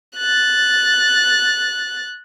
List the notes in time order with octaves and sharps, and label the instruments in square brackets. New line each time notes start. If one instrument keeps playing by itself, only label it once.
[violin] F#6 A6